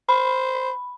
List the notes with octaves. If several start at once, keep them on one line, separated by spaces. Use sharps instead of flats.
C5 B5